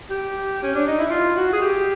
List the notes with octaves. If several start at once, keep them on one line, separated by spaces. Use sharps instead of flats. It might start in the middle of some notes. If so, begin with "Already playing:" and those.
G4
C#4
D4
D#4
E4
F4
F#4
G#4
G4